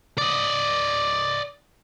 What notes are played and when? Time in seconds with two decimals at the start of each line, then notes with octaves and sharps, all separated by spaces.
0.18 D5 D#5